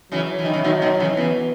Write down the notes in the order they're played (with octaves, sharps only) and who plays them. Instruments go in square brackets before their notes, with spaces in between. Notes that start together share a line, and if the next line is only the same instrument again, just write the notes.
[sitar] C#3 E3 [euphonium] F#3
[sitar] E3
D#3
C#3 E3
[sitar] B2 D#3 [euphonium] F#3
[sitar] B2 D#3
C#3 E3
[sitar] C#3 E3 [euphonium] B3